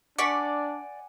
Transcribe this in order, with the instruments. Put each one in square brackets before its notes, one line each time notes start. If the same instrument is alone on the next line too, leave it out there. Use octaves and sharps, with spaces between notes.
[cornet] D4 [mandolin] D5 [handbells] F#5 G#5 [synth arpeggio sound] C#6 D6 B6